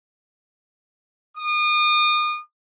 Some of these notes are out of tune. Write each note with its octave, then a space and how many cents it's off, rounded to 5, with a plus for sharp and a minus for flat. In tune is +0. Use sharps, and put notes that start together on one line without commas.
D#6 -35